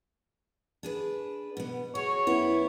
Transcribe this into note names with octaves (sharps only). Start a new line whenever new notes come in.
D4 G#4 B4
B2 B3
F#4 G#4 C#5
F#2 B3 E4